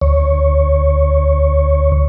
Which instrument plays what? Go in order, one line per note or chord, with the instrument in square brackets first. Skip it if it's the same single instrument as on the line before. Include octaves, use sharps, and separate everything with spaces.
[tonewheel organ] D2 C#5